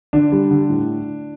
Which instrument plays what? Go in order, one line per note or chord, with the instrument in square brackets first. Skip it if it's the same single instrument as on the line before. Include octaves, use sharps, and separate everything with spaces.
[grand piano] D3 D4
G3
D3
A2